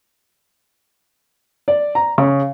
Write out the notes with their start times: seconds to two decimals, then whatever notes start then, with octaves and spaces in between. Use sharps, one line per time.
1.68 D5
1.95 A#5
2.18 C#3